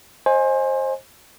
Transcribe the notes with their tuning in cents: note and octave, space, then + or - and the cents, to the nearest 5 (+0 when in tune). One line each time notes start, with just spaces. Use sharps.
C5 +25 D#5 +0 G#5 +0